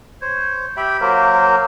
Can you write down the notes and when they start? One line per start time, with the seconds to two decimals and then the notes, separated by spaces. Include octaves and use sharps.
0.21 C5 C#5
0.77 G4 E5 G5 B5
1.01 F#3 A#3 A#4 C5